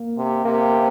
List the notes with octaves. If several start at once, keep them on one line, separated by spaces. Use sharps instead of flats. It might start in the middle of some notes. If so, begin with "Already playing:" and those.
Already playing: A#3
C3
C3 A#3
C4